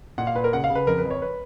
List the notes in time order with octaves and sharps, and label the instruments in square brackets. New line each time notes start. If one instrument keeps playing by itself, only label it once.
[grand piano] A#2 F#5
F5
A#2 B4
A#4
C#3 F#5
F5
C#3
B4
F2 A#4
B4
F2
C#5
B4